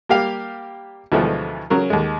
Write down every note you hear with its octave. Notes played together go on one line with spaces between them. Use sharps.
G3 A#3 G4 F5
D2 B2 E3 F3 G#3 A3
C#3 F#3 A#4
D#2 G#3